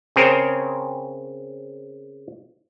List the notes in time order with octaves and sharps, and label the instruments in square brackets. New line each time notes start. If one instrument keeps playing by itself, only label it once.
[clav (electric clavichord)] C#3 C4 G#4 A#4 C5 C#5